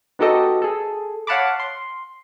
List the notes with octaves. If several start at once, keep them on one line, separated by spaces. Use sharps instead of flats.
B3 D#4 F#4 G4 A4 D#5
G#4 A4
C#5 F5 F#5 A5 B5 D6
C6